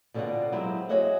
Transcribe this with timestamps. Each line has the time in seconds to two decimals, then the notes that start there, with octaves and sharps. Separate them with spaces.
0.14 B2 D3 G3 C4 F4 F#5
0.52 F#3 G#3 B3 C4 E4 G4
0.89 F#4 G#4 C#5 D#5 E5 F#5